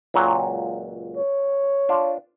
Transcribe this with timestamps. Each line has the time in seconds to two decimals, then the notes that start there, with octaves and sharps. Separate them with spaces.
0.14 C#2 A#2 F#3
1.17 C#5
1.89 D4 F4